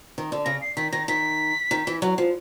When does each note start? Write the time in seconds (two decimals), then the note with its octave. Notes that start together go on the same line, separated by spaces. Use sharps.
0.18 D#3
0.32 D3
0.45 C#3 A#6
0.62 C7
0.77 D#3 B6
0.92 D#3 A#6
1.08 D#3 B6
1.71 D#3
1.87 E3
2.02 F#3
2.18 F3